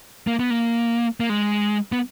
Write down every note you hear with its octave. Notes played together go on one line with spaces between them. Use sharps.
A#3
B3
A#3
A#3
G#3
B3